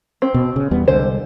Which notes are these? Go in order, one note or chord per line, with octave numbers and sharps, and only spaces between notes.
C4
B2
C#3
E2 G3 B3
C2 D3 G#3 C5